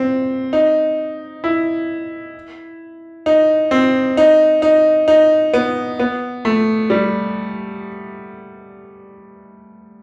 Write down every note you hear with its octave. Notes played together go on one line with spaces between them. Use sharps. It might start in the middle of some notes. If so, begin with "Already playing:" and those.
Already playing: C4
D#4
E4
D#4
C4
D#4
D#4
D#4
B3
B3
A3
G3